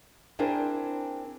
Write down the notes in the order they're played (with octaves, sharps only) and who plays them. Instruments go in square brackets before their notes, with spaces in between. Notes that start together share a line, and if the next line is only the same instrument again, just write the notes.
[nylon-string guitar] C4 D4 E4 G#4 A#4 C5